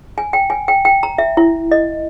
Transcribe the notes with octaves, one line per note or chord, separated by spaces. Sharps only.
G#5
G5
G#5
G5
G5
A#5
E5
E4
D#5